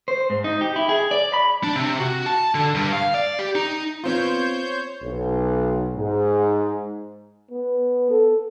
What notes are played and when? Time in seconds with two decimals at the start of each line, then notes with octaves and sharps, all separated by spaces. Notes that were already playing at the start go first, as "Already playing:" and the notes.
0.08 C5
0.30 G#2
0.44 D#4
0.61 G4
0.76 E4
0.89 G#4
1.11 D5
1.34 B5
1.64 D4
1.76 C3
1.99 F#4
2.26 A5
2.55 D3
2.75 G2
2.93 F5
3.15 D5
3.39 G4
3.55 D#4
4.04 B3 C4 F4 C5 C#5 G6
5.03 B1
5.95 G#2
7.51 B3
8.11 A4